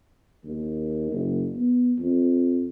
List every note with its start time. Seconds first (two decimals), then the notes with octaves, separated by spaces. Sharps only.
0.45 D#2
1.12 F#1
1.56 B3
1.99 F2